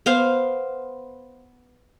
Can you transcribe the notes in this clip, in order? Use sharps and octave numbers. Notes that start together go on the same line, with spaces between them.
B3 C5 F5